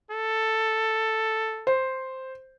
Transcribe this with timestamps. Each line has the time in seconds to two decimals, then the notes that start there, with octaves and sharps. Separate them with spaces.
0.11 A4
1.67 C5